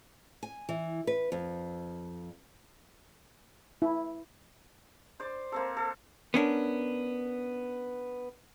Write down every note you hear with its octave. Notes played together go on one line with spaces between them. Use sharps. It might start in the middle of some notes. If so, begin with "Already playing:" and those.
G#5
E3
B4
F2
E4
C5 D5
A#3 C4 A4
A4
B3 C#4 D4 A#4